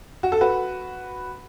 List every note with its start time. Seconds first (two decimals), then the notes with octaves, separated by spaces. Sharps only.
0.23 F#4
0.32 A4
0.41 F#4 B4